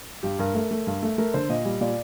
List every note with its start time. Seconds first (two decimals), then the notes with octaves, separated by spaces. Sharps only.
0.23 G2 G4
0.39 G2 A#4
0.54 A3
0.71 A3
0.87 G2
1.03 A3
1.18 A3 A#4
1.34 D3 C5
1.49 A#2 D#5
1.65 G3
1.81 A#2 D5